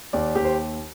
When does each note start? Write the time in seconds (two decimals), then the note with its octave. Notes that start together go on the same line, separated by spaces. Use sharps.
0.13 D#2 D5
0.35 D#2 G4
0.44 C5